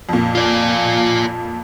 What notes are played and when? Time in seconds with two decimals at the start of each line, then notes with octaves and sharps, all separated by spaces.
0.09 F2 A#2
0.35 F4 D5